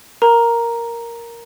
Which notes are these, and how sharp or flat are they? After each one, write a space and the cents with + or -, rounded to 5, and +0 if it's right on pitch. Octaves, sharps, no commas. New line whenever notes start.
A#4 +0 A#5 +0